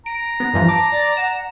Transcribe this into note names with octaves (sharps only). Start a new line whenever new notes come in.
A#5 D7
B3
G2 E3 F3
A5 D6
D5
F#5 E7